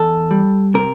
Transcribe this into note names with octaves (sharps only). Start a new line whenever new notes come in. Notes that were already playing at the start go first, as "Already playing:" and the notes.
Already playing: E2 A4
G3
C3 A#4